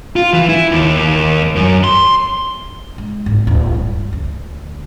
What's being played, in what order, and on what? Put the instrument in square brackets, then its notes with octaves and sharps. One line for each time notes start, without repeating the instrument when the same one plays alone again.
[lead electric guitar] F4
E3
E4
D#2
F#2
C6
[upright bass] G#3
G#1
D1
G2
D2